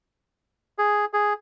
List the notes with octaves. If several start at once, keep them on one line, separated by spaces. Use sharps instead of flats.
G#4
G#4